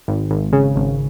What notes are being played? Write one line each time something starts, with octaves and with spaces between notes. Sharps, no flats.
G#1
G#1
C#3
G#1